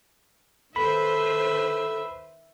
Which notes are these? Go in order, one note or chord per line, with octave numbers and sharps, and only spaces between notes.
D#3 A4 B4 C5 E5 B5